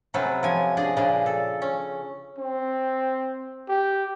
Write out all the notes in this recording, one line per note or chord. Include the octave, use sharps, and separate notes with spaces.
C3 F#3 C#4 A4 B4 B5
F3 G#5
D4 G#4 D5 D#5
A#2 C#3 D4
A4
C#4
C4
G4